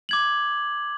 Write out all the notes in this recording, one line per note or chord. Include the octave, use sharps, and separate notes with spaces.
D6 G#6 F#7